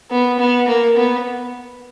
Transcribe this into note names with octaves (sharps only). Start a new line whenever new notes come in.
B3
B3
A#3
B3